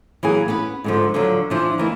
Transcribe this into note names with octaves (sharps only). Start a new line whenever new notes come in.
E3 F#3 A#3 G#4
B3 C#4 B4
G#2 D3 F3
D3 F3 F#3
E3 F3 D4
D#3 E3 A#3